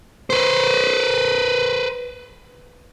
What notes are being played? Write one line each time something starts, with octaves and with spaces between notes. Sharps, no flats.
B4 C5